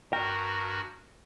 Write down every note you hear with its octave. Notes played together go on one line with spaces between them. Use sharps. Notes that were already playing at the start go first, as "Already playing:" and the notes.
G2 F#4 A#4 G5